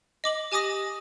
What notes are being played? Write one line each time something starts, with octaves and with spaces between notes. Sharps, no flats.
D#5 D6 F#7
G4 G#5 D6 D#6 A#6